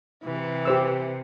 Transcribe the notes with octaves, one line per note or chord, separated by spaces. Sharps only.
C3 E3
G4 C5 E6